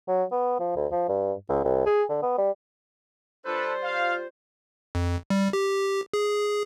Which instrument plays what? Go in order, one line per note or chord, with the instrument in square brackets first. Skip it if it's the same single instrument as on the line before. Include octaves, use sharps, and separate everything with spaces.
[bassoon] F#3
B3
F3
D2
F3
G2
C#2
C2
G#4
D3
B3
G3
[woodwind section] G3 F4 C5 [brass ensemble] D4 A4 B4
[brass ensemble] F5
[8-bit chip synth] F2
G3
G4
G#4